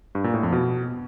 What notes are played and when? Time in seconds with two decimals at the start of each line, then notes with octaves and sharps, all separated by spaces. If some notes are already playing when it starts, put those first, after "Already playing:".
0.15 G2
0.24 A#2
0.34 A2
0.43 F2
0.53 B2